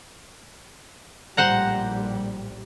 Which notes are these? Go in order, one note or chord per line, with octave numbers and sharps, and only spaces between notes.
A#1 A2 G3 C5 F#5 A#5